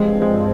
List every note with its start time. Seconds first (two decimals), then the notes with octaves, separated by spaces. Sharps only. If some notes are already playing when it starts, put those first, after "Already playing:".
Already playing: G2 F3 G#3 C4
0.22 G#3